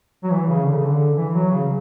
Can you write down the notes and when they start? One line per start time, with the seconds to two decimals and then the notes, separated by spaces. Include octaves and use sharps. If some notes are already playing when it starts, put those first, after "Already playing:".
0.24 F#3
0.31 E3
0.49 C#3
0.65 D3
0.75 C#3
0.86 D3
1.16 E3
1.34 F#3
1.51 C#3